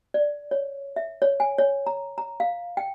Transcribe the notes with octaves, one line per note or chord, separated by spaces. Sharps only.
D5
C#5
E5
C#5
G#5
C#5
A#5
A#5
F5
G5